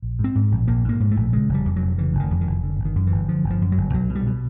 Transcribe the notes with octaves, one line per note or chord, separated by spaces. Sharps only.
A#1
G#2 C4
G#2
A#1
A#1 A#3
G#2 A#3
G#2
A3
A#1
C#3 G#3
F1
G3
F2
F1 F#3
C#3 E3
F1 D3
D#3
F2
D#3
F1
D3
G1
D#3
F#2
E3
G1
D3 F3
G1
F3
F#2
F#3
G1
B1 F#3
B2
G3
B2